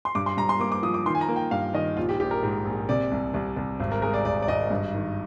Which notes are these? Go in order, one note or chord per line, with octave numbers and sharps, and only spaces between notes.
C6
G2 D6
C6
G2 A#5
C6
A#3 D6
D6
F3 D#6
D6
D#3 C6
G#5
A#5
A#3
G5
G2 F5
D#3 D#5
A#1 F4
G4
A#1 G4
A#4
G#2
A#1
C3 D5
C2
C2
C2
G#1
A#4
G#3 A#4
D5
G#1 D5
D5
G#1 D#5
G2
D#3